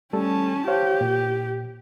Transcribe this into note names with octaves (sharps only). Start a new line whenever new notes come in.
G3 A3 C#4 A4 A5
G4 C5 C#5 F5
A#2